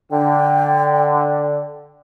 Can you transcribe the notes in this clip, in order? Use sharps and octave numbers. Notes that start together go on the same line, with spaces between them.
D3 G5